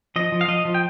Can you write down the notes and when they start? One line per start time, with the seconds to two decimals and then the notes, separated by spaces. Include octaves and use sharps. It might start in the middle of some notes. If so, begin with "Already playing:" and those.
0.16 F3 D#5
0.32 F3
0.41 F5
0.48 F3 D#5
0.65 F3
0.75 G5